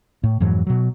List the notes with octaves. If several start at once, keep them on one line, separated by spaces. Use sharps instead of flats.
A2
F2 G#2 E3 F#3
B2 F#3